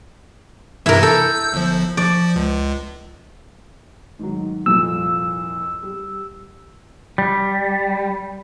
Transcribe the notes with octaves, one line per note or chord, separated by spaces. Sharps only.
G2 C3 E3 E4 A#4
A4 E6 G6
G1 F3
F3 D5
C#2
G#2 D#3 F#3
C2 F2 A#2 E6
G3
G3